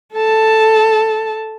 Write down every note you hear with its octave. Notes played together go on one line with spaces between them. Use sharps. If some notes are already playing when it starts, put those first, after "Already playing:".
A4 A5